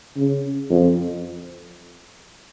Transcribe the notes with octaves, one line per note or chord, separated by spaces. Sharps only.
C#3
F2